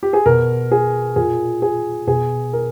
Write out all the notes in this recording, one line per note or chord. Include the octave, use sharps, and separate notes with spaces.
G4
G#4
B2 A#4
G#4
A#2 G#4
G#4
B2 G#4
A#4